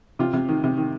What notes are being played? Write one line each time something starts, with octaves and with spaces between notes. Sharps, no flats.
C3 F4
C3
D#3
C3
D#3